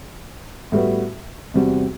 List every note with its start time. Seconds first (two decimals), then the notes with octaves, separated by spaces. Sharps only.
0.72 A2 G3 B3 F#4 B4
1.54 E2 C3 G3 C4 F#4